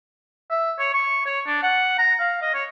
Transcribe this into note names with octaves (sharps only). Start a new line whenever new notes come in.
E5
C#5
C#6
C#5
D4
F#5
A#5
F5
D#5
C#5